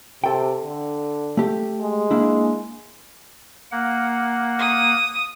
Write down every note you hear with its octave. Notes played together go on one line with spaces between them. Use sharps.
C3 A4 G5
D3
A3 G4
G#3
A#3 D4 E4
A#3 F#5
D#6